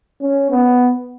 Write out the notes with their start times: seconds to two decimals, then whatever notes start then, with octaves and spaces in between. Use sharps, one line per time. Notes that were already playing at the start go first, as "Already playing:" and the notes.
0.22 C#4
0.51 B3